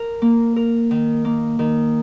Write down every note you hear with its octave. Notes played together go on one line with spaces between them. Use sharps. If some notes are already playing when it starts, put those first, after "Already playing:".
Already playing: A#4
A#3
A#4
D#3
A#3
D#3